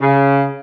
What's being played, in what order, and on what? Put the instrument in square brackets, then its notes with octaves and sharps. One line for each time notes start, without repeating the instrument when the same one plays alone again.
[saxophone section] C#3